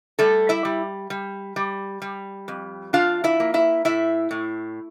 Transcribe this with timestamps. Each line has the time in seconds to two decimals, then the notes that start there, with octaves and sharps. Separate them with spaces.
0.19 G3 A3 A4
0.49 E4 E5
0.65 G3
1.10 G3
1.56 G3
2.02 G3
2.48 F2
2.93 D4 F4 F5
3.24 E4 E5
3.40 A#3
3.54 E4 E5
3.85 A2 E4 E5
4.31 A2